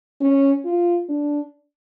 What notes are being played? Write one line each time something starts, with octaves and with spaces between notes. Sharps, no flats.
C#4
F4
D4